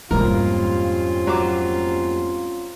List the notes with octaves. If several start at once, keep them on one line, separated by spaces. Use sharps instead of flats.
F1 D#2 G#2 G3 C4 C#4 F4 A#4
F#3 D6